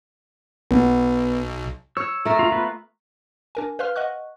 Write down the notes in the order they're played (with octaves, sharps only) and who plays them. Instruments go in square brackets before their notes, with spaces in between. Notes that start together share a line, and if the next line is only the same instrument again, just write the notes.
[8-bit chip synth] B1 [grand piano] B3
[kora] C#5 [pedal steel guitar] E6
[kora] A3 A#4
[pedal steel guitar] F4
B3 F4 B4
[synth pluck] D4 A#4 G#5
B4 C5 F5 C6 F6
D#5 F#5 C#6 F#6